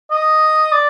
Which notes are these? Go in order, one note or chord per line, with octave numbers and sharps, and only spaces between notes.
D#5
D5